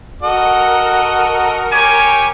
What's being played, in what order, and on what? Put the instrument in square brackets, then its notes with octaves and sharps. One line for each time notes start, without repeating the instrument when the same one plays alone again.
[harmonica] F#4 A4 D#5 [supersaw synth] A#4 C#7
[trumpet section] G4 C#5 G#5